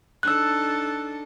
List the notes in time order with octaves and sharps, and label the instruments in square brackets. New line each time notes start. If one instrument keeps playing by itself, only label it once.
[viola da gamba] D4 D#4 A4 [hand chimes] E6 F#6